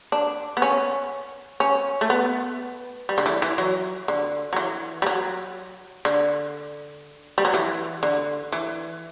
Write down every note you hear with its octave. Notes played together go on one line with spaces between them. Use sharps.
D4
B3
C#4
C#4
A3
B3
G3
D3
E3
E3
F#3
D3
F#3
E3
G3
F#3
D3
G3
F#3
E3
D3
E3